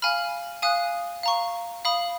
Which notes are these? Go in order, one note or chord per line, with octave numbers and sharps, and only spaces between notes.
F5 G#5 B5 F6
F5 G#5 D#6 F#6
F5 A#5 C#6
F5 B5 D#6